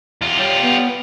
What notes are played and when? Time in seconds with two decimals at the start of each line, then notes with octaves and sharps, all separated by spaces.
0.22 E2 F4
0.39 G3 F4 C#5
0.62 B3